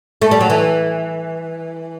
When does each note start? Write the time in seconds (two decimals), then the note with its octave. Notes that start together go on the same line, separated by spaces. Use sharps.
0.22 A3
0.31 G3
0.41 F#3
0.50 E3